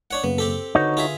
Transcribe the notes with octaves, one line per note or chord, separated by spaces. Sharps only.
D4 C#5 F#5
F#2 C#3 A#3 B3
C4 G4 A4
D3 D#4 F#4 B4 C#5 D#6
F4 G#4 E5